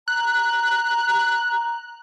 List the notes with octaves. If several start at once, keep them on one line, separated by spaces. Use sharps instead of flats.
A#5 F#6